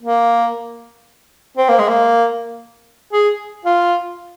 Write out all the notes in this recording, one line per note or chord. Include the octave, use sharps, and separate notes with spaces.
A#3
C4
A#3
G#3
A#3
G#4
F4